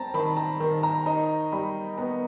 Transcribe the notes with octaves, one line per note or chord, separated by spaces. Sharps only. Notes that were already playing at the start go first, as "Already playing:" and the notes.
Already playing: G3 C4 A5 A#5
D#3 B5
A#5
D#3
A#5
D#4 A#5
G3 B5
B3 A#5